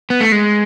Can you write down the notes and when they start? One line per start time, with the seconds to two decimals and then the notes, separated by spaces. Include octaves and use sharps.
0.10 B3
0.21 A3
0.32 G#3